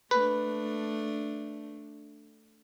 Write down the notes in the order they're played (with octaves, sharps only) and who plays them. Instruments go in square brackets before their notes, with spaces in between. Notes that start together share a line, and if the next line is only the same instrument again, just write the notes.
[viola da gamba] A3 D4 [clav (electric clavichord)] B4